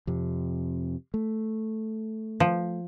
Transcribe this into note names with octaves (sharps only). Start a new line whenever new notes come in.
F2 C3
A3
F3